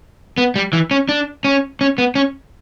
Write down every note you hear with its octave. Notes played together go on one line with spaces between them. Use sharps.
B3
G3
E3
C#4
D4
C#4
C#4
B3
C#4